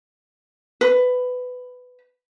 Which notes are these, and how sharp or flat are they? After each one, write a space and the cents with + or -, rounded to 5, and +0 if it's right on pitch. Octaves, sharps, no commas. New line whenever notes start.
B4 +15